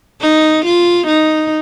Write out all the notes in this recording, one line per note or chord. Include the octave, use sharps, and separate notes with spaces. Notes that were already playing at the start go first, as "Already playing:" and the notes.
D#4
F4
D#4